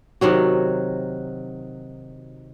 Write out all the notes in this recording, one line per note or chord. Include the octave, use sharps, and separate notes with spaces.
C3 D#3 F#3 F#4